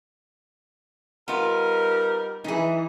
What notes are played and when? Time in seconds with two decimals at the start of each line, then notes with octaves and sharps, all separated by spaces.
1.28 G3 B3 D#4 F4 A#4
2.44 E3 D#4 G#4